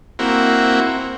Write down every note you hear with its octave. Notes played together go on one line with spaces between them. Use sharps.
A#3 C4 E4 F#4